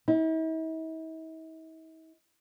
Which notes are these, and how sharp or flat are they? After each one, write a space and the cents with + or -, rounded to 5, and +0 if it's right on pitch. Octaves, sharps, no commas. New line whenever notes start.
E4 -45